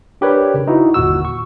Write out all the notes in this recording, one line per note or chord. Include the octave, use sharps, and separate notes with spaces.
D4 G4 A#4 B4 C#5 D5
C#3
D#4 E4 F#4
G1 D#2 A#2 F#4 E6
C#6